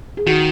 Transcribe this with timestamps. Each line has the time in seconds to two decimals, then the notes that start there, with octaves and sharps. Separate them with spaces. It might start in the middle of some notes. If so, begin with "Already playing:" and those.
0.17 G#4
0.26 D#3 F#4